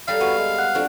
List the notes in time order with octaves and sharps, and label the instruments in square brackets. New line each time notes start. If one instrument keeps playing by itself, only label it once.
[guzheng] G3 A4 A#5 [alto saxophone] F5
[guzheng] B3 [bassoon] F#4
[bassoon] G#3
[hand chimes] F#5 F#6
[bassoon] F2 [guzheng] D4 F#4